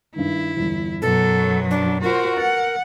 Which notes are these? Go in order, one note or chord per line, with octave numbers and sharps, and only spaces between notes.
G2 D#3 E4
G1 E2
F#2 B2 F#3 A4
D4
F4 F#4 A#4 C5
B4 F#5 A6